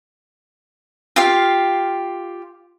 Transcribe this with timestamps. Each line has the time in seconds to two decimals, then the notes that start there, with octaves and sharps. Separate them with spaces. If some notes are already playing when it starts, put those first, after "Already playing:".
1.16 F4 G4 F5